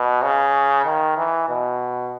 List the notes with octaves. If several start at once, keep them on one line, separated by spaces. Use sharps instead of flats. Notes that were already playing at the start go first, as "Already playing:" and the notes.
Already playing: B2
C#3
D#3
E3
B2